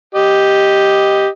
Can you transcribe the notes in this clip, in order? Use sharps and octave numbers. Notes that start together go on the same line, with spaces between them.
G4 D#5